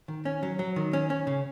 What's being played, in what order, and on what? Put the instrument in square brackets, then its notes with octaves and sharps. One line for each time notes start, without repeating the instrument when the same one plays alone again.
[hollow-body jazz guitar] D#3
C#4
F#3
F#3
D#3
C#4
C#4
C#3